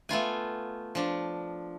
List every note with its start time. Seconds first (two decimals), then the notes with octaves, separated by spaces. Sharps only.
0.09 A3 B3 F4 G#5
0.95 F3 D4